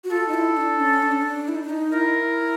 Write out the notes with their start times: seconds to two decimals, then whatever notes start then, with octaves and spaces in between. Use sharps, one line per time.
0.04 F#4
0.11 F4 A4
0.28 D#4
0.34 E4
0.57 D4
0.79 C#4
1.02 D4
1.12 C#4
1.22 D4
1.48 E4
1.55 D#4
1.62 D4
1.69 D#4
1.93 E4 A#4